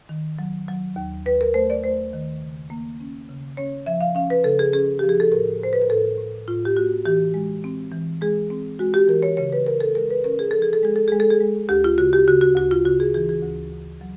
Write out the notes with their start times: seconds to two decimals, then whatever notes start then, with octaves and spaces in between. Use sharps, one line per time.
0.09 D#3
0.39 F#3
0.68 F#3
0.96 D#2
1.26 D#2 B4
1.41 A#4
1.54 A3 C5
1.70 D5
1.84 A3 C5
2.13 D#3
2.42 C#3
2.70 A#3
3.00 C#4
3.29 C#3
3.57 C#4 C#5
3.86 F3 E5
4.01 F5
4.15 C#4 F5
4.30 B4
4.44 C#3 A4
4.59 G#4
4.73 C#4 G#4
4.99 F3 G4
5.09 G#4
5.20 A4
5.31 A2 A#4
5.61 A2 C5
5.73 B4
5.82 A#4
5.89 A2 A4
6.18 A2
6.48 A2 F4
6.65 G4
6.77 A#3 F#4
7.05 E3 G4
7.34 G#3
7.64 C4
7.92 E3
8.21 G#3 G#4
8.50 C4
8.79 G#3 F#4
8.94 G4
9.08 E3 A#4
9.23 C#5
9.37 C#3 C#5
9.52 B4
9.66 C#3 A#4
9.80 A4
9.95 G#3 A#4
10.10 B4
10.24 C#4 A#4
10.39 G#4
10.51 F3 A4
10.62 G#4
10.73 A4
10.83 G#3 G#4
10.96 A4
11.08 G#3 G#4
11.20 A4
11.30 G#4
11.41 G#3
11.69 D2 G4
11.84 F4
11.98 C#3 F#4
12.13 G4
12.28 C#3 F#4
12.41 F#4
12.56 D2 F#4
12.71 F4
12.85 C#3 F#4
13.00 G#4
13.14 E3 G#4
13.29 G#4
13.43 D2
13.72 D2
14.01 F#3